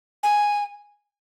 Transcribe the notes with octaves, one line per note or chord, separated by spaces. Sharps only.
G#5